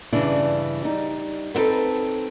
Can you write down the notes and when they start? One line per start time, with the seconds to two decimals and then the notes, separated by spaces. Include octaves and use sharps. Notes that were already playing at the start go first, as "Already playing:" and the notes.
0.13 G2 C#3 E3 D4 E4
0.82 G3 D#4
1.55 B3 C4 D#4 A4 B4